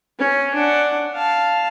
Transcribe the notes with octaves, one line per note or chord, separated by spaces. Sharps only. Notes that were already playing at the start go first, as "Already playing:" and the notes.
C#4
D4 F#5
F5 A5